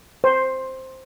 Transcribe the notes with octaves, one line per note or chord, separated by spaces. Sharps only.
C5